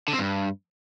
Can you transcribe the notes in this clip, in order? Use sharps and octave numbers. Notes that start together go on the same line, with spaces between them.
D3
C4
G2